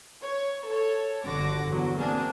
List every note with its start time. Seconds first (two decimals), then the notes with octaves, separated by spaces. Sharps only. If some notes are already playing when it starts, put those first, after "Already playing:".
0.21 C#5
0.67 A4 C#5
1.23 G1 D3 F#4 D6 A#6
1.67 E2 F#3
1.98 A#3 C4 D4 G#4